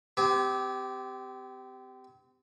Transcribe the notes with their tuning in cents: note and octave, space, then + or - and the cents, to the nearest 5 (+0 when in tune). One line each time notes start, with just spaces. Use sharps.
C4 -30 G4 +0 G#5 +40